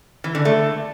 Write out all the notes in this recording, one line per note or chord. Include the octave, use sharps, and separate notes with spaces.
E3
D3
A3